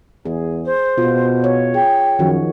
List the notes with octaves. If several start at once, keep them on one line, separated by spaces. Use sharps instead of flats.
E2 G#4
C5
B2 F4
C#5
G#4 G5
F#2 D#3 F3 F#4